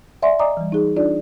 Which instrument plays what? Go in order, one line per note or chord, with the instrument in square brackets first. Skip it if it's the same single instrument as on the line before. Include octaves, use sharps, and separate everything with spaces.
[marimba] D5 E5 F#5 G#5 C6
D5 D#5 G#5 A#5 D6 D#6
E3 G3
D#4 G#4
D4 D#4 F4 D5